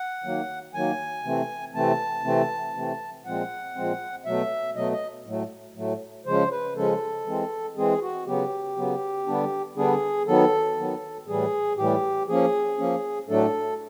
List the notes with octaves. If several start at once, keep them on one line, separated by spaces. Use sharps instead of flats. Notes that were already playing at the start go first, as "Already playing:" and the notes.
Already playing: F#5
D#3 F#3 A#3
D#3 F#3 A#3 G#5
C3 E3 A3 C4
C3 E3 A3 C4 A5
C3 E3 A3 C4
C3 E3 A3 C4
A#2 F3 G#3 C4 F#5
A#2 F3 G#3 C4
B2 F#3 A3 E5
B2 F#3 A3 D#5
D#5
A2 F#3 A3
A2 F#3 A3
C#3 F3 G#3 C#4 C5
B4
C#3 F3 G#3 C#4 A4
E3 G#3 C4
E3 G#3 C4 G#4
F#4
C#3 F#3 B3 G4
C#3 F#3 B3
D3 G3 B3 D4
D3 G3 B3 D4 G#4
D#3 F#3 B3 A4
D#3 F#3 B3
A2 E3 G3 G#4
A2 E3 G3 G4
F3 A#3 C#4 G#4
F3 A#3 C#4
A2 F#3 A3 D4 A4